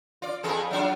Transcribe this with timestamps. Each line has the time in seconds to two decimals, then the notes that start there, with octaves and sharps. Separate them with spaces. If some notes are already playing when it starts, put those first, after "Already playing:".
0.22 F4 D5
0.43 F2 G#4 A4
0.71 F#3 D4 F4